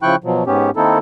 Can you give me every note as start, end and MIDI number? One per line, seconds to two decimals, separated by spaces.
0.03 0.16 49
0.03 0.16 53
0.03 0.16 64
0.03 0.16 79
0.03 0.16 85
0.03 0.16 90
0.24 0.44 47
0.24 0.44 53
0.24 0.44 54
0.47 0.70 44
0.47 0.70 59
0.47 0.70 61
0.47 0.70 67
0.76 0.98 51
0.76 0.98 58
0.76 0.98 60
0.76 0.98 63
0.76 0.98 64
0.76 0.98 69